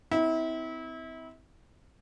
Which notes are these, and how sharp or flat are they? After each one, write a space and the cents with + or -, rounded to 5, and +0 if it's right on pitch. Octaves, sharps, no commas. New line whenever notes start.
C4 -30 E4 -30